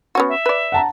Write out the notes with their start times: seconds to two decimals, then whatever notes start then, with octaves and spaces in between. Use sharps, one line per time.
0.15 B3 C#4 F#4
0.29 E5
0.46 B4 D5
0.72 F#5 A5 A#5